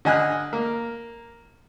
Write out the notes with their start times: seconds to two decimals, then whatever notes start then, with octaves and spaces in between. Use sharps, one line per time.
0.05 D3 D#5 G#5 F6 F#6
0.53 A#3